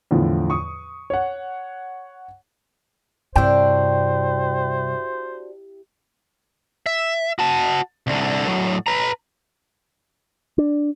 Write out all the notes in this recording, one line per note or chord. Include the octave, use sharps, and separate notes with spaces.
E2 A2 D3 F3
C#6 D#6
C#5 F#5
G2 C3 D4 E4 F#4 G4 C5 G5
E5
F#4 A5
C2 D3
A2 F#3
B4 A#5
D4